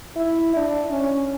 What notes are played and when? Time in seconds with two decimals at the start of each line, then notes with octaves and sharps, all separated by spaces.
0.16 E4
0.56 D4
0.90 C#4